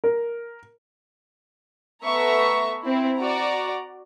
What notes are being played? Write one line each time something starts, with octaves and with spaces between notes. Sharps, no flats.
A#4
A3 B3 E5 A#5 C#6
C4 E4
F#4 D5 A#5